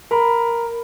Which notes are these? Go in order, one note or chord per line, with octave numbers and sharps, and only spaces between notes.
A#4 B5